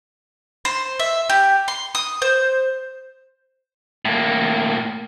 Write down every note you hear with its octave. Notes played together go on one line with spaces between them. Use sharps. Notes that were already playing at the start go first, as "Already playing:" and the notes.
C5
E5
G4
C6
D#6
C5
A2 A#3